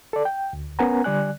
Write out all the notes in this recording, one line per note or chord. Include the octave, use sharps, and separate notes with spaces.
A4 D5
G5
D2
B3 C#4 A#4 F#5 G#5 A#5
D3 G3 D5 G#5 F#6